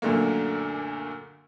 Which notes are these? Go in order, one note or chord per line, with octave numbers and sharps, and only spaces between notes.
F#2 A#2 D3 A3 A#3